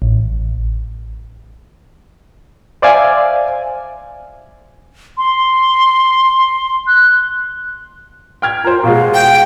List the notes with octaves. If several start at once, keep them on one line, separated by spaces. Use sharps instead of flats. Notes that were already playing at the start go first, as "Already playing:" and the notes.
A1
C5 D5 E5 F5 G#5
C6
F#6
G5 F6 G#6
F4 A#4 C5
B2 G#3 F5
G5